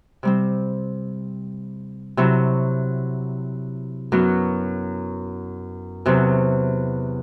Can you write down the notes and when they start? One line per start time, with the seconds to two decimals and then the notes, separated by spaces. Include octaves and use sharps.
0.23 C3 G3 C4
2.17 C3 F#3 C4 E4
4.12 F#2 F#3 B3 E4
6.06 E2 C3 F#3 C4